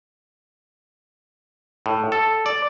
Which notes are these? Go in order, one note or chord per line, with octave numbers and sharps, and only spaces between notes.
A2
A4
D5